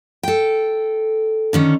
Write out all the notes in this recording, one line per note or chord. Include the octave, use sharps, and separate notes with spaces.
A4 G5
D3 D#3 C#4